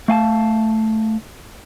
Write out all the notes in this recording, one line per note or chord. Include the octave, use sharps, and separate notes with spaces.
A3 F5 G#5 A5